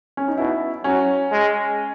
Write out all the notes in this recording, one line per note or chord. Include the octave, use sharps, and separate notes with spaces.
C#4
D#4
B2 E4
F#3 C#4
G#3